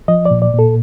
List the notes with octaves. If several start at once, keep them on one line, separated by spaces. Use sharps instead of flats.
F3 D#5
D5
A#2
D5
A#2 A4